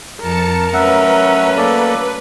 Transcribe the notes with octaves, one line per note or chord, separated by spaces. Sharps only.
F2 A#4 A5 C#7
F#3 A3 C#4 B4 E5 F#5
A#3 A4 D5